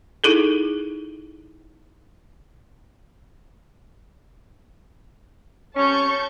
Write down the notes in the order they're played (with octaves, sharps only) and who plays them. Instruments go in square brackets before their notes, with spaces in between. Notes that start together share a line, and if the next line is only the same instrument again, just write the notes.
[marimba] D#4 E4 G#4 A4
[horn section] G3 C4 C#4 [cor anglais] C#5 [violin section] A5 C#6 G6